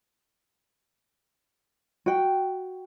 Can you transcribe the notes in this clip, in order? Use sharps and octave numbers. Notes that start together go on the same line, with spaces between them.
F#4 G5